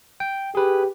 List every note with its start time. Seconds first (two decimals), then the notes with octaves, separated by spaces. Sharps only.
0.20 G5
0.55 G4 G#4 B4